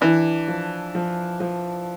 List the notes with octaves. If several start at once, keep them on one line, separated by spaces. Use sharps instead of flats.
E3 D4
F3
F3
F3